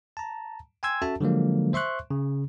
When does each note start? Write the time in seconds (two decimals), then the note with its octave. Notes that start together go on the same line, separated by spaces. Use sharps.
0.17 A5 A#5
0.83 G5 G#5 C6 E6 G#6
1.02 C#4 F#4 A4 E5 A5
1.21 D3 F3 F#3 G#3 A#3
1.73 C5 E5 C6 C#6 F#6
2.11 C#3